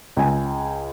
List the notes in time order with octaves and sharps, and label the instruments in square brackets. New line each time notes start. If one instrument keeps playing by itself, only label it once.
[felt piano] C#2 G#5